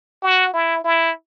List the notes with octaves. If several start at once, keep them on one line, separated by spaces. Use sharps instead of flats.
F#4
E4
E4